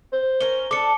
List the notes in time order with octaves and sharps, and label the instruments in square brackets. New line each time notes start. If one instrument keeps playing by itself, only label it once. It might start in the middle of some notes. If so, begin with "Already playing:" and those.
[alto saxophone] C5
[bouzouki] C#4 A#4 [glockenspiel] G7
[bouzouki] D4 A4 [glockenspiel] D6 C#7